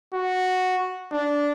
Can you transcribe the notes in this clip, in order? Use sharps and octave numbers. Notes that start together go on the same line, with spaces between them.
F#4
D4